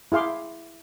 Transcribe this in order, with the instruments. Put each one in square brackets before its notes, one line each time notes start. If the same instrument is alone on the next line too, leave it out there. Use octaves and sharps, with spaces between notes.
[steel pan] E4 G#4 F5 C6 D6